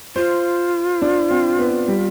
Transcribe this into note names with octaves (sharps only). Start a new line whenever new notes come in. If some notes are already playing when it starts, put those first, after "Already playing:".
F4 C5
D4
C4
B3
G3